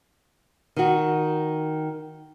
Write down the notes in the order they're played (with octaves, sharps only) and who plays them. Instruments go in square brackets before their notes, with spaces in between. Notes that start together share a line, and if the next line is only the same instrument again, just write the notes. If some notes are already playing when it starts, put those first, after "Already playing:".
[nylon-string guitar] D#3 F#4